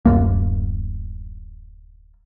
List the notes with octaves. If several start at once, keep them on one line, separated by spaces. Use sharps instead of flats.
D1 C#2 F#2 A#3